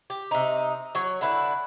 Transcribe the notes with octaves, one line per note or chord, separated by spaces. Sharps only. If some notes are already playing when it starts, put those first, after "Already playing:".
G4
C3 D#4
F#3 C#5
D3 E4 B4